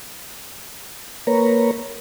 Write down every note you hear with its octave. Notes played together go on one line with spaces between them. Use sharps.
A#3 A#4 B4 C#5 A#5